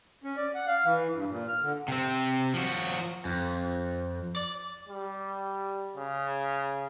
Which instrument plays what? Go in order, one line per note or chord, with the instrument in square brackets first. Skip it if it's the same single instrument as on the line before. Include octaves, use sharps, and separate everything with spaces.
[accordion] C#4
D5
F#5
F5
E3
G2
A#2
F6
D3
[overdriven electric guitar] C3 C4
F3 F#4
F2
D5
[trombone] G3
C#3